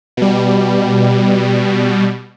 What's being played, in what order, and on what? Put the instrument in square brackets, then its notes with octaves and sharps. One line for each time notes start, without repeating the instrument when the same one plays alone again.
[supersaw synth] B2 G3